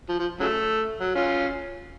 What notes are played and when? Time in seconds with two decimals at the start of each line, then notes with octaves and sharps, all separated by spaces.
0.09 F3
0.19 F3
0.40 C#3 F#3 A3
1.00 F#3
1.15 C#4 F4